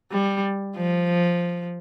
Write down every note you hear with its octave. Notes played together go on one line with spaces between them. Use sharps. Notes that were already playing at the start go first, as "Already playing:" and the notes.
G3
F3